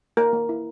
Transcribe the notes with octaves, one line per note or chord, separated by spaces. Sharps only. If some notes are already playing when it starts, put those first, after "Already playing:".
A#3 A#4
A#3
E4